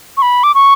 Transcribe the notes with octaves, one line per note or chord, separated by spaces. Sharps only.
C#6
B5
D6
C#6